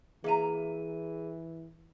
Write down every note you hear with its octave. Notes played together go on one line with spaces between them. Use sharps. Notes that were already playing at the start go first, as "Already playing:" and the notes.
E3 A#3 G#4 E5 A#5 D#7